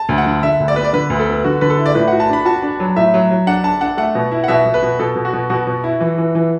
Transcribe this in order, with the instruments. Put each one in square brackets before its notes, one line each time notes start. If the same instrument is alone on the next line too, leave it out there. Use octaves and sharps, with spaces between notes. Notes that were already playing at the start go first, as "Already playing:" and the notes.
Already playing: [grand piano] A5
[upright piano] D2
[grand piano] F#5
[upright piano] D3
[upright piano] D3 [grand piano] E5
[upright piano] D2
[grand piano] D5
[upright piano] B3 [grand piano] B4
[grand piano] D5
[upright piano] D3 [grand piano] B4
[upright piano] D2
[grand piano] A4
[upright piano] B3
[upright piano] D3 [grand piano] F#4
[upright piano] D3 [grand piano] B4
[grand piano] A4
[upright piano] E4
[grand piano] D5
[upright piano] A2 [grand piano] B4
[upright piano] F#4 [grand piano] F#5
[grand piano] A5
[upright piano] D4 [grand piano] B5
[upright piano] F#4 [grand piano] A5
[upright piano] D4
F#3
[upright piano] A2 [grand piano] E5
[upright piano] F#3
F#3
[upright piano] D4 [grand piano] F#5
[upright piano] D4 [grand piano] A5
[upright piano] D4 [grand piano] F#5
[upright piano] A3 [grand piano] F#5
[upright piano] B2
E4
[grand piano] F#5
[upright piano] B2 [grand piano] E5
[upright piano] B2
[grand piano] B4
[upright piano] B2
[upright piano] B2 [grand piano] A4
[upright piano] B2
[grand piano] F#4
[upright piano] B2
[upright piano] B2 [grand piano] F#4
[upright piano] B2
E4
E3
E3
E3